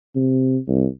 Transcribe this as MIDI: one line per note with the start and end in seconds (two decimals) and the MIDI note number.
0.16 0.58 48
0.68 0.86 36